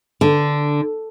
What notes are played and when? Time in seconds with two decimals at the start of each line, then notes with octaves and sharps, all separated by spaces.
0.21 D3